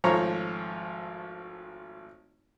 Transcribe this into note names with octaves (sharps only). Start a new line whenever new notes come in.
G#1 F3 A3 C#5 A#5